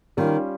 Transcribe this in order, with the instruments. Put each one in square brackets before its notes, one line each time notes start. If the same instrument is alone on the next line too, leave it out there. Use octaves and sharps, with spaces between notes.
[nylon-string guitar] D#3 [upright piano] G3 C#4 F4